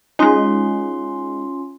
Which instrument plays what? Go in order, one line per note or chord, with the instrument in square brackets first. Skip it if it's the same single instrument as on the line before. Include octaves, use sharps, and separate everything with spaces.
[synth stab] G#3 D#4 [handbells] C#4 F4 C6